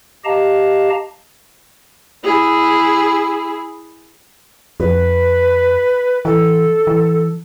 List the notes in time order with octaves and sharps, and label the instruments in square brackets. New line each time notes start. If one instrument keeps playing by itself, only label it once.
[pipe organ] G4 D#5 F5 A5 A#5
[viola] E4 G#4
[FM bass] F2 [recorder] B4
[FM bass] E3 [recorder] A4
[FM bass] E3